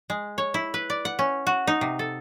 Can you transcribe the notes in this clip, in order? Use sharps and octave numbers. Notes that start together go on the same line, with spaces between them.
G#3
C#5
E4
B4
D5
F#5
C#4
F#4
D#4
C3
A4